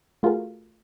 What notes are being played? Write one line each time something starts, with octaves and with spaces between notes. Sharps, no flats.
A3 F4 F#4 G#4 A#4